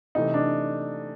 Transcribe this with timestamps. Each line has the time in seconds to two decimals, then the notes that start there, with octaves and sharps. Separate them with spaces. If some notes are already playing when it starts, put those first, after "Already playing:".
0.15 C3 E3 A3 D#4
0.34 D4